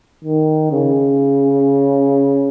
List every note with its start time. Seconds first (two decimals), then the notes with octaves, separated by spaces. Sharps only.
0.24 D#3
0.72 C#3